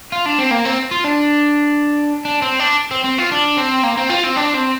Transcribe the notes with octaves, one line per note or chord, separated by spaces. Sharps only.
F4
D4
C4
A#3
C4
F4
D4
D4
C4
D4
C4
C4
F4
D4
C4
A#3
C4
F4
C4
D4
C4